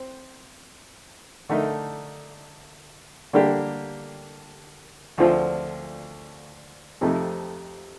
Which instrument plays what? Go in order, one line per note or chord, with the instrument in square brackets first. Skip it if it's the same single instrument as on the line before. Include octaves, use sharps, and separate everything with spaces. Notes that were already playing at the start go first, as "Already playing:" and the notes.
Already playing: [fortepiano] C4
D3 A3 D#4 A#4
D3 G3 A#3 D4 G4
D2 D3 F3 C4 F4
F2 C3 F3 A3 D#4